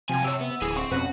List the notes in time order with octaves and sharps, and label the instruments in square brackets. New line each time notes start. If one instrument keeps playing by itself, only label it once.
[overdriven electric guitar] F#2 G#5 [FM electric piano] C3 G5 G#6 [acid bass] F3
[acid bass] C3 [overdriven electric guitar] G4 C#5 [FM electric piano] E6
[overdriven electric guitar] B3
[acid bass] D1 [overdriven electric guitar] E3 [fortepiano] G#4
[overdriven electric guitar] C4 [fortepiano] C#6
[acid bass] F2 [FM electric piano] B2 C4 C#4 [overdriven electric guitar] F#4 [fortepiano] B4